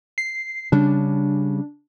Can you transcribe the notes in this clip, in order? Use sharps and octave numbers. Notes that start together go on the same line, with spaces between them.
C7
C#3 G3 C#4 D4